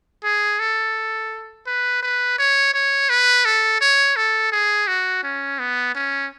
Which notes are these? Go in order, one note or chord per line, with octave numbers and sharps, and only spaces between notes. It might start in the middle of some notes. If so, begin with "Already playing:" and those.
G#4
A4
B4
B4
C#5
C#5
B4
A4
C#5
A4
G#4
F#4
C#4
B3
C#4